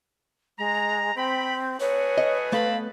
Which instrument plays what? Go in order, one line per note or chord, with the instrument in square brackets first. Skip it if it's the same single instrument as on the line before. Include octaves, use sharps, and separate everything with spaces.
[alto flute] G#3 [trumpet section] A#5
[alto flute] C4 [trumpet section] G5 B5
[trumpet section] A3 F#4 G#4 [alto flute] B4 [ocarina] C#5
[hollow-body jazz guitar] D#5
[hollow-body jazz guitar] A3 B3 [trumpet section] C4 A5 B5 [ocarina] F5